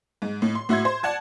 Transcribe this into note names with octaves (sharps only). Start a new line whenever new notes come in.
G#2
A2
C6
A2 F#4 E5 C6 G#6
C5
D5 F#5 A5 G#6